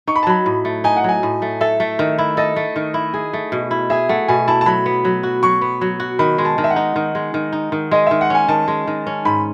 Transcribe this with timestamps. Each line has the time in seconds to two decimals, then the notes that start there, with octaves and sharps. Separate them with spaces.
0.07 D#4 C#6
0.16 B5
0.23 A5
0.27 F#3 B5
0.46 A2
0.65 A3
0.84 D#4 G#5
0.97 F#5
1.04 F#3 G#5
1.23 A2
1.42 A3
1.61 A4 E5
1.80 A3
1.99 D#3
2.18 E4
2.37 A4 D#5
2.56 A3
2.76 D#3
2.94 E4
3.14 G#4
3.33 A3
3.52 B2
3.71 E4
3.90 G#4 E5
4.09 A3 F#5
4.28 B2 G#5
4.48 E4 A5
4.61 A5
4.66 F#3 B5
4.86 B3
5.05 F#3
5.23 F#4
5.43 F#3 C#6
5.61 B3
5.81 F#3
6.00 F#4
6.19 D#3 B5
6.38 G#3
6.45 A5
6.58 D#3
6.64 E5
6.70 F#5
6.76 D#4
6.96 D#3
7.15 G#3
7.34 D#3
7.53 D#4
7.72 D#3
7.91 G#3 D#5
8.07 D#3 E5
8.21 F#5
8.30 C#4 G#5
8.48 D#3 A5
8.68 G#3
8.87 D#3
9.07 C#4
9.25 G#2 B5